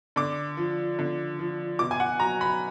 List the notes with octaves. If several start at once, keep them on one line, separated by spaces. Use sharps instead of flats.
D3 D6
F3
D3
F3
B2 D6
G#5
F#5
F#3 A#5
B5